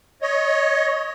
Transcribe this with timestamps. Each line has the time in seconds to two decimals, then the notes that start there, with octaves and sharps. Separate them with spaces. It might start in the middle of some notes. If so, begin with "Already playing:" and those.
0.22 C#5 D#5